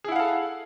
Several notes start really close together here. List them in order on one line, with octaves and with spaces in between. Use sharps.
G#4 E4 F#5 F5 A4